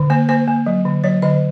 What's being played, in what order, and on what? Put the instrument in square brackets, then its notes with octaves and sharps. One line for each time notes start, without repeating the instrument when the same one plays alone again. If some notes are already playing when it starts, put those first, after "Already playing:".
Already playing: [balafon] D3
A#3 C5
A#3 C5
A#3
F#3
D3
F#3 C#5
D3 D#5